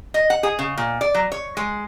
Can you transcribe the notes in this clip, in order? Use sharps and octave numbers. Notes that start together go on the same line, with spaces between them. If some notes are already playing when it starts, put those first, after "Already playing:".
D#5
F#5
G#4
C#3
A#2
D5
F#3
C#5
G#3